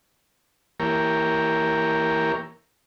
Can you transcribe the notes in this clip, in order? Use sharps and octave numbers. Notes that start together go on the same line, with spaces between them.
E3 A#3 G4 A#4 C#5